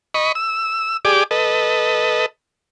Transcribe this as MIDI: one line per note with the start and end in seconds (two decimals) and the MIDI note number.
0.14 0.32 75
0.14 0.32 83
0.14 0.32 85
0.35 0.97 88
1.05 1.24 67
1.05 1.24 68
1.05 1.24 74
1.05 1.24 86
1.31 2.26 69
1.31 2.26 71
1.31 2.26 75